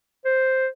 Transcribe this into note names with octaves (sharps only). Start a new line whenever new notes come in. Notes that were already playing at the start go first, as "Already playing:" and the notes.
C5